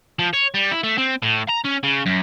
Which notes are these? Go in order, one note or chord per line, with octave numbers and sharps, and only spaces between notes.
F3
C#5
G3
E4
A3
C4
A2
A#5
C#4
C#3
F#2